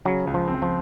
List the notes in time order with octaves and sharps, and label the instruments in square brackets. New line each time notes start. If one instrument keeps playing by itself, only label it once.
[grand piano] C#3 [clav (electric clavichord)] F#3
[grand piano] C#2
[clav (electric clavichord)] F3
[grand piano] C4
[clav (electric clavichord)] F3